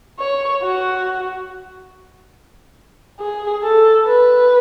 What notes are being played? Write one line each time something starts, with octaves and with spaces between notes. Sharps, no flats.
C#5
F#4
G#4
A4
B4